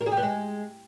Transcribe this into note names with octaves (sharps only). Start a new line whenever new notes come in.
A#4
G#4
G4
B3
G#3